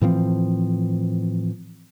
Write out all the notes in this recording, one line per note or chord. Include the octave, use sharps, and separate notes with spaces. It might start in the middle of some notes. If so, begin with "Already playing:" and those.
A2 E3 F3 C4